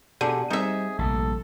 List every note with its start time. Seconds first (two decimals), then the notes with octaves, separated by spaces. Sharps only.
0.21 B2 D3 G4 G#4
0.50 G3 C4 D#4 G#4 E5
0.99 A#1 G2 C3 A3 A4